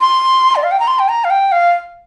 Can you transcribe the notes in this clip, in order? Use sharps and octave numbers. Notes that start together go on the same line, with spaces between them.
C6
D5
F5
G5
A#5
C6
G5
A#5
F5
G5
F5